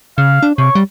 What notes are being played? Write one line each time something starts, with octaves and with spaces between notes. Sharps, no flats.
C#3 F5
D4
C3 C#5
G3